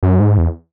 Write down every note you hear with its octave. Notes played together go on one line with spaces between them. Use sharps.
F#2
G#2
E2